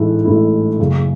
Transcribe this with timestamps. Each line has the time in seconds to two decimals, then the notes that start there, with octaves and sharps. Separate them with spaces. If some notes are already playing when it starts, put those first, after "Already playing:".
Already playing: A1 G#2 E3 A3 E4
0.24 A1 G#2 E3 A3 E4
0.79 F#1 F#2 C#3 F#3